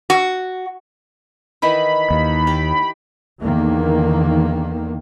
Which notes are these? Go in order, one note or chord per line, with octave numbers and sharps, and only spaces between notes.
F#4
D#3 E3 D#4 B5
D#2
G4
E2 D3 D#3 A#3